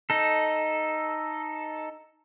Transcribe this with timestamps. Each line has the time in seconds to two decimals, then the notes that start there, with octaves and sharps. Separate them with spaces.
0.10 D#4 A4